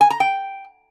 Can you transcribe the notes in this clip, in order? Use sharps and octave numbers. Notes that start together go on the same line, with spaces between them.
G#5
A#5
G5